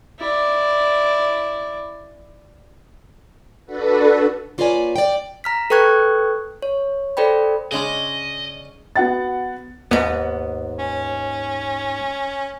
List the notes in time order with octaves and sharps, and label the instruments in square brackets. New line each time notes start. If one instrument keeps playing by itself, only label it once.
[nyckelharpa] E4 D5
[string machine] D4 F#4 A4 B4
[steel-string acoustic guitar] A#3 F4 B4 C#5 D5 G#5
D5 G5
[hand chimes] A#5 F6 B6
A4 B4 G5 C#6 F#6 G#6
C#5
A4 C5 D5 G5 B5
[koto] C#3 G#3 [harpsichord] C#4 D4 G#4 [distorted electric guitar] D#5
[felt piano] B3 F#4 B4 F#5 A6
[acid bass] D#2 [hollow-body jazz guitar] G#2 B3
[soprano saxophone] C#4